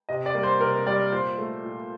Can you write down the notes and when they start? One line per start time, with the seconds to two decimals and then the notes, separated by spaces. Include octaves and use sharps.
0.09 C3 D#5
0.26 D5
0.35 G3 A#3
0.43 C5
0.60 C3 A#4
0.87 G3 A#3 D5
1.12 A#2 C5
1.38 A3
1.64 A#2